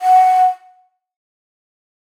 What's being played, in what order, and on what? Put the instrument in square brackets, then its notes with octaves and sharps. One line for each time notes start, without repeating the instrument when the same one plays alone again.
[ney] F#5